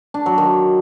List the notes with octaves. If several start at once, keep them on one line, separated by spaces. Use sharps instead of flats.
D4
F#3
D#3